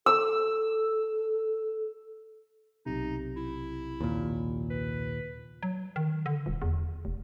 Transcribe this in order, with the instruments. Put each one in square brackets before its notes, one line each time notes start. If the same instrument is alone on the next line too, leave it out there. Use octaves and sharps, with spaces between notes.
[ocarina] A4 [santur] E6
[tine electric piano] B1 C3 [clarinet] D#4
[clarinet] E4
[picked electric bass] D#2 A#2
[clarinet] B4
[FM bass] F#3
D#3
D3
D#1
E2
F1